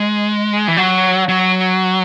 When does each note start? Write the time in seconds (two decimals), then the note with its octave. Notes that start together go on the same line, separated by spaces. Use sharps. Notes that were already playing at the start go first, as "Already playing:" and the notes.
Already playing: G#3
0.68 E3
0.77 F#3
1.28 F#3